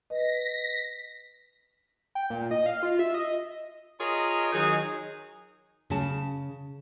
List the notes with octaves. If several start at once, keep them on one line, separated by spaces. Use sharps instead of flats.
B4 D#5 A#6 B6
G5
A#2
D#5
F5
F4
E5
D#5
F4 G#4 A#4 C#5 D#5 A#5
D#3 F#3 D#4 G#4
C#3 A5